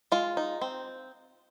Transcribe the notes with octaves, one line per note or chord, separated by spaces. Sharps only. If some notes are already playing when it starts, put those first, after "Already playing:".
G#3 F4
D#4
C4